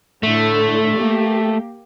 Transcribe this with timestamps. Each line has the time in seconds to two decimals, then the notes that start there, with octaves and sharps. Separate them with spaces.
0.23 A2 D3 A3
0.96 A#3 G4